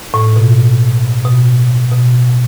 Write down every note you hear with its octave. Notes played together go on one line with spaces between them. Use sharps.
A2
B2
B2
B2